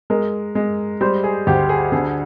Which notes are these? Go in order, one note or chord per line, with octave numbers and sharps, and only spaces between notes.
G#3 A#4
G#3
G3 C5
G#4
D2 G4
G#4
D3 G#4